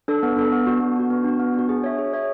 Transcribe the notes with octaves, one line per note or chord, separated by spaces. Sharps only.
D4 A4
B3
D4 A4
B3
D4 F#4
B3
D4 F#4
B3
D4 F#4
B3
D4 F#4
G#4
C#5 E5
G#4
C#5 E5